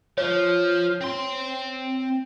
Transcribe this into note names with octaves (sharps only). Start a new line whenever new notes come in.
F3 C#5
C4 C6